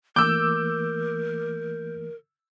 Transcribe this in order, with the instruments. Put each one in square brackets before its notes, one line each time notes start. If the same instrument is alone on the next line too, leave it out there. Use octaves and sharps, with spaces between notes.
[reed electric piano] E3 A3 A#3 [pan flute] A#4 [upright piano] D6 E6 [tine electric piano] G6